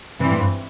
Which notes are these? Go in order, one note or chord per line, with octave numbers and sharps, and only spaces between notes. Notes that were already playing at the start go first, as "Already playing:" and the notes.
G2 C3 E3 C4
A2
G2